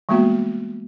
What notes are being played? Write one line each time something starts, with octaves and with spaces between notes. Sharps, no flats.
E3 G3 G#3 A#3 B3 F#4